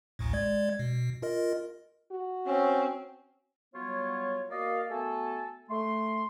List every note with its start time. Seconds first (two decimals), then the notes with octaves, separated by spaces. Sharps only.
0.19 A1 D2 A2
0.33 G#3 D5 G#6
0.79 B2
1.22 F4 A#4 D#5
2.12 F#4
2.46 C4 C#4
3.74 F#3 G3 B3 F4 C#5
4.50 A#3 F#4 A#4 D5 D#5 F5
4.90 A3 B3 F#4 A4 G#5 A5
5.70 A3 C6